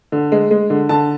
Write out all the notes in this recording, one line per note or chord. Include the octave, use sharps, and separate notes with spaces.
D3
G#3
G#3
D3
D3 A5